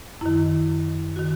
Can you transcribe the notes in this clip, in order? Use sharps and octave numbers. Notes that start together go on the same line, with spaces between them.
F#2 D#3 E4
D#3 F#4